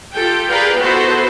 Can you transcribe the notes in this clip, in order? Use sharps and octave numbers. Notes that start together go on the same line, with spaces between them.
F4 G4 A4 G5
G#4 A#4 B4 D5 F5 G5
B3 E4 F#4 A4 B4 C5